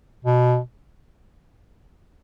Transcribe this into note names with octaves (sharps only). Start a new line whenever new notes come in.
B2